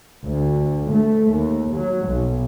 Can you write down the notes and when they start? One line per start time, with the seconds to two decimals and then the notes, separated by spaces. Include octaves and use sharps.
0.24 D2
0.92 A3
1.31 D#2
1.76 F#3
2.06 B1